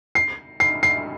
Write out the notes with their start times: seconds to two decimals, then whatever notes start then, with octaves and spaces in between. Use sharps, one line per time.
0.15 C7
0.60 C7
0.83 C7